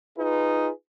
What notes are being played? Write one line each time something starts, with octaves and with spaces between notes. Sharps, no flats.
D#4 F4 G#4 B4